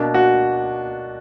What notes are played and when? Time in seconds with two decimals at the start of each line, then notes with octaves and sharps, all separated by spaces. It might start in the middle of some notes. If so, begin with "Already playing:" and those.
Already playing: B2 A#3 D4
0.14 F#4